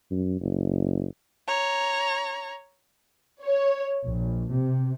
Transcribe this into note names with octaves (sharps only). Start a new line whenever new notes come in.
F#2
F#1
C#5 A#5
C#5
A#1
C3